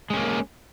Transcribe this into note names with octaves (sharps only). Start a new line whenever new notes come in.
G#3 A#3 C#4